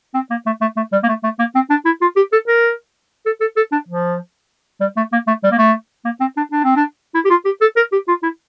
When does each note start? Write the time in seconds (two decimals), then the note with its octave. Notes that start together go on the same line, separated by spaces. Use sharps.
0.14 C4
0.30 A#3
0.46 A3
0.61 A3
0.76 A3
0.92 G3
1.03 A#3
1.09 A3
1.24 A3
1.39 A#3
1.55 C4
1.70 D4
1.85 E4
2.01 F4
2.16 G4
2.32 A4
2.48 A#4
3.26 A4
3.41 A4
3.57 A4
3.72 D4
3.88 F3
4.81 G3
4.97 A3
5.12 A#3
5.27 A3
5.44 G3
5.51 A#3
5.58 A3
6.05 A#3
6.20 C4
6.37 D4
6.52 D4
6.64 C4
6.76 D4
7.14 E4
7.25 G4
7.30 F4
7.45 G4
7.61 A4
7.76 A#4
7.92 G4
8.08 F4
8.23 E4